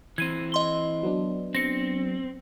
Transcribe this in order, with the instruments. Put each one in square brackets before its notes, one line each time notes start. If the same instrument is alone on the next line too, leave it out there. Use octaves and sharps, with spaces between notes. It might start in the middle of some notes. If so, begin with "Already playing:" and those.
[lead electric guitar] E3 C4 [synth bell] G#6 D#7
[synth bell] D#5 C6 G7
[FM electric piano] F#3 B3 D4
[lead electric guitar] C4 [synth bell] A#6 C#7